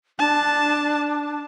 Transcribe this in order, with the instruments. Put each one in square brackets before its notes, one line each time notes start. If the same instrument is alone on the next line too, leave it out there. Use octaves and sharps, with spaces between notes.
[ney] D4 [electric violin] A5